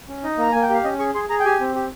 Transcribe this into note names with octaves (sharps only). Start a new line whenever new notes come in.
C#4
D#4 D#5
A#3 A#5
A#3 G#5
G5
G4 F5
C#4 D#5
G#4 C#6
G#4 C6
G#4 A#5
G5
G4 G#5
C4
G4